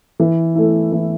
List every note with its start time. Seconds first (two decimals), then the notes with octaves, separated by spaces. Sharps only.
0.19 E3
0.55 A3 E4
0.92 E3